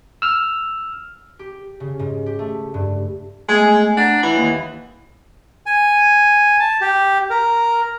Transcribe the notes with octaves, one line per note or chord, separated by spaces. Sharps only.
E6 F6
G4
C#3
G#2
G4
A3
G2
G#3 A3 B3 G#5
D4 F#5 A#5
E3
D#2
G#5
A5
G4
A#4